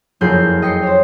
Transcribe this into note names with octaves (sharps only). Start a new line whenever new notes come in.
F#1 F2 G#4 G6 C7
D#5 G5 C7 C#7
C5 C#5